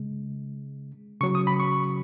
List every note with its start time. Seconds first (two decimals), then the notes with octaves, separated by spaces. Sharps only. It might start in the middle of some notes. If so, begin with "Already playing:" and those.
Already playing: C#3 G#3
1.21 C#3 F#3 C#6
1.35 D#6
1.47 B5
1.60 C#6